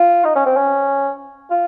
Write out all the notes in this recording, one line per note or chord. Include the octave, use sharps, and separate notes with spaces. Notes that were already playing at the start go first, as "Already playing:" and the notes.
Already playing: F4
D#4
C#4
C4
C#4
F4